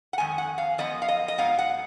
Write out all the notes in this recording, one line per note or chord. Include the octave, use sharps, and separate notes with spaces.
F#5
F2 D#3 G#3 G#5
F#5
F5
F#2 F3 B3 D#5
F5
D#5
D#5
G#2 F#3 B3 F5
F#5